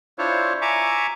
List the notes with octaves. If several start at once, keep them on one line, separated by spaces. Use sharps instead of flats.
D4 E4 F4 C5 C#5
E5 G#5 A#5 C#6 D6